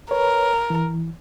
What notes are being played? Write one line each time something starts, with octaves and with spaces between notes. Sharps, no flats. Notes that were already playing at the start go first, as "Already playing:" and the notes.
A#4 B4 C#5
E3